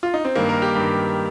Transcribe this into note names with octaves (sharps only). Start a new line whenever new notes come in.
F4
D#4
C4
G2 D#3 A#3
A#4
G4
G2 D#3